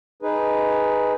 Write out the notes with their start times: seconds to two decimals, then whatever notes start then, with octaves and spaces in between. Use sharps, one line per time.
0.22 D#4 G#4 B4